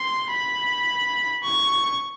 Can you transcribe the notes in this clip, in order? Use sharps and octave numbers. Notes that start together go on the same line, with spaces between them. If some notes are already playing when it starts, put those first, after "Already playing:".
Already playing: C6
B5
C#6